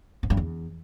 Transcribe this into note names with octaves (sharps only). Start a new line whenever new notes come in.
G#2
G2
E2